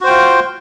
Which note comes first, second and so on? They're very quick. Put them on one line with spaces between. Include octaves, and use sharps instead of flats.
F#4 C5 G5 F4